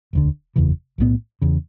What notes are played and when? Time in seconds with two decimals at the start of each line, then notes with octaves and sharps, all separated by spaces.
0.13 E1 D2 D3
0.56 F#1 E2 C#3 E3
0.98 B1 A2 E3 B3
1.42 E2 C#3